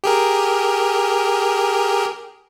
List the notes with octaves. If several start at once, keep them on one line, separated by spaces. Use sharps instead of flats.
G4 G#4 A#4